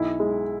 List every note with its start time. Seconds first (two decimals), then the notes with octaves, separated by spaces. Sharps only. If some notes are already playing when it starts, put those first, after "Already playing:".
Already playing: B1 E4
0.20 G#3